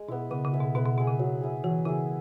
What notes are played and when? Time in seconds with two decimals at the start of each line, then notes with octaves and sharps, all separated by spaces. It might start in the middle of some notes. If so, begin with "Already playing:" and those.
Already playing: G#3
0.08 B2 E4
0.12 B3
0.31 C#3 B3
0.45 C#3
0.53 G#4 E5
0.60 B2
0.75 B2 B3
0.86 B2
0.98 B2 G#4 E5
1.08 C#3
1.19 F#3
1.41 E4 G#4
1.64 E3 F#3
1.85 C#3 E4 G#4